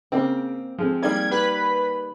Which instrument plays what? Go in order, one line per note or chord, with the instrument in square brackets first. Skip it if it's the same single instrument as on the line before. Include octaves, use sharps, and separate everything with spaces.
[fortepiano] C#3 [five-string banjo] A#3 C4
[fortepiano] F3 G#3 C4
[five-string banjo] D#3 G3 A#3 [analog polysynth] G#6
[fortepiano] G4 [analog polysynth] B4 B5